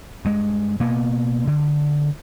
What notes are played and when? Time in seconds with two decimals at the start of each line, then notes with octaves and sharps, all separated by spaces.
0.25 G2 G#3
0.80 B2 A#3 B3
1.47 D3